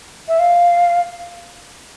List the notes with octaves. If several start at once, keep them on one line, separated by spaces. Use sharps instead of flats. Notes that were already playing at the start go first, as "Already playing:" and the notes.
E5
F5